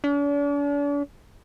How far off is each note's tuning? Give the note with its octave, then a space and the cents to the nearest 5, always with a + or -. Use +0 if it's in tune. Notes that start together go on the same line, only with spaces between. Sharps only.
D4 -45